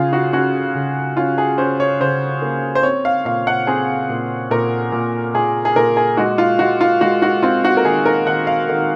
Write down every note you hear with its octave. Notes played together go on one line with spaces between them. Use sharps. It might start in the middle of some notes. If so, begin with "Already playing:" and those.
Already playing: C#3 C#4 F4 G#4
F#4
C#4 F#4
C#3
C#4 F4
G#4
C#4 C5
C#5
C#3 C5
A#3
C5
C4 C#5
F5
A#2 F5
F#5
C4 G#4
A#2
A#2 A#4
A#2
A#2 G#4
G#4
A#2 A#4
G#4
G#3 F#4
F4
G#3 F#4
F4
G#3 F#4
F#4
C4 F4
F#4
A#4
D#3 G#4
A#4
D#3 F#5
F5
D#3